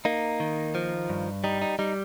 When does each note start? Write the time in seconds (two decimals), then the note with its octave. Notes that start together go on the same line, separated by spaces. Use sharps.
0.05 A#3 D#4
0.40 D#3
0.75 F3
1.09 G2
1.44 G3 D#4
1.62 D#4
1.79 G3 D#4